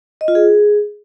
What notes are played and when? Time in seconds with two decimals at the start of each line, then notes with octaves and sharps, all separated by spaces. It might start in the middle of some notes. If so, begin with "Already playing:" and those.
0.21 D#5
0.28 F4
0.35 G#4